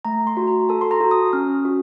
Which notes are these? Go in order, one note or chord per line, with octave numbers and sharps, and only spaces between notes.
A3 A#5
C6
F#4
A#5
A4 A5
C6
A#5
F#4
D#6
C#4 F6
F#4